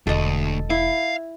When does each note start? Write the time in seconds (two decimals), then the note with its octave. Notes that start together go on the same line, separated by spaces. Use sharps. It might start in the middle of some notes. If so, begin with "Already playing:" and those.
0.07 E1 D2 A4 D#5
0.70 E4 F5